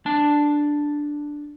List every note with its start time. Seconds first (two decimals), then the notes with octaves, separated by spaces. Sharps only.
0.06 D4 A5